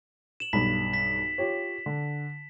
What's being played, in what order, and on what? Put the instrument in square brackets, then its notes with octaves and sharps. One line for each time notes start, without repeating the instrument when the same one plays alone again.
[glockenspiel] E7 F#7
[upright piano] B1 G2 B5 [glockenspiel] B6
[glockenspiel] B6
[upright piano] F4 G4 C#5
D3